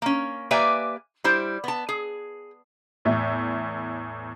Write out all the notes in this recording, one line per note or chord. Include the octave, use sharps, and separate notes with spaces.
A#3 C#4
A#3 G4 B4 D5 E5 G#5
G3 E4 C5
B3 A5
G#4
E2 A2 E5